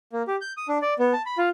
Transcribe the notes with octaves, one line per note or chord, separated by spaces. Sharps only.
A#3
G4
G6
D#6
D4
D5
B3
A5
B5
F4